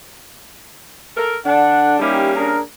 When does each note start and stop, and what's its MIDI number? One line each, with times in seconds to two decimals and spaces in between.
1.15 1.36 69
1.15 1.36 70
1.46 1.96 50
1.46 1.98 62
1.46 1.96 78
2.00 2.57 55
2.00 2.57 58
2.00 2.57 61
2.00 2.30 63
2.00 2.30 64
2.00 2.30 67
2.36 2.61 62
2.36 2.61 68
2.36 2.61 70